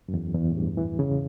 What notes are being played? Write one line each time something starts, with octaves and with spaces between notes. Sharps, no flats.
F#2
E2
E2
A2
G2
E3
C#3